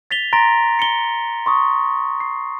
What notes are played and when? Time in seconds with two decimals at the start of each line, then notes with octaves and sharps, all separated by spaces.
0.11 A6 B6 F7 G7
0.33 A#5 C6 A6 A#6 D7
0.79 C#7 G7
1.46 C6 C#6 D#6
2.20 C7